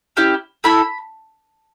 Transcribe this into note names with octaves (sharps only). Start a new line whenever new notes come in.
C#4 E4 G4
A3 E4 A4 B5